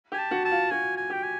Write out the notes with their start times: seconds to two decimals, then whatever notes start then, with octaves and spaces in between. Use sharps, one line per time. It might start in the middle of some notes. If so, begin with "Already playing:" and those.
0.12 G4 G#5
0.19 A5
0.31 F#4
0.45 A5
0.51 F4
0.71 F#4 G#5
0.97 G#5
1.10 G4 G5
1.23 G#5